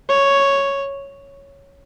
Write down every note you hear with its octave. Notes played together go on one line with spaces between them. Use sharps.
C#5